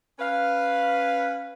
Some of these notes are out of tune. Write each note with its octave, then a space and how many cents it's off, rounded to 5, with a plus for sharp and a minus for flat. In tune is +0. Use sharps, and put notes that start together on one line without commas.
C#4 -10 B4 +0 F5 +0